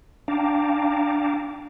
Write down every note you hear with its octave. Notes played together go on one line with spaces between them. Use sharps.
D4 F5 G5 A5 A#5 D6